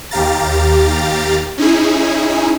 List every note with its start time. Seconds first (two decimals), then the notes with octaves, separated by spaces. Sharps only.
0.11 D#2 G4 F5 A#5 A6
1.58 C#4 D#4 E4 G#4